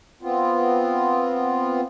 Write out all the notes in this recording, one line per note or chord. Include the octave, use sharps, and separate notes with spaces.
B3 C4 F4